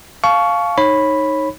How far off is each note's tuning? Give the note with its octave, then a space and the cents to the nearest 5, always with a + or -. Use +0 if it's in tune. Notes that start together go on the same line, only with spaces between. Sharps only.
F5 +0 A5 -30 C#6 +15
D#4 +0 C#5 -25 B5 +0